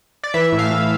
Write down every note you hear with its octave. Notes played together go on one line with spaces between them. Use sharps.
D5
E3 E5
A2
F5
A2